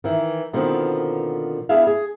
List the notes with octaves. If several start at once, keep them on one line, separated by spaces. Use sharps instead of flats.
D#3 E3
B2 D3 D#3 F3 B3 C4
B3 D4 E4 G#4 E5 F5
G#4